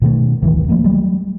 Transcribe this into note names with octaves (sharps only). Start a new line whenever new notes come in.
B2 D#3 F#3 A3
D1 G2 D#3 E3
F3 A3 A#3
F#3 G3 A3